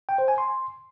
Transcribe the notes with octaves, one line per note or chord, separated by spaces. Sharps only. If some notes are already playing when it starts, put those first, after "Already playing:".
G5
C5
G#5
C6